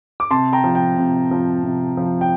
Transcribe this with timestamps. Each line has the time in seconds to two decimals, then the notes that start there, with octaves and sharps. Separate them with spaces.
0.20 D6
0.30 C3 A5 C6
0.53 G5 A#5
0.64 F3
0.75 G5
0.97 C3
1.31 F3
1.64 C3
1.97 F3
2.21 G5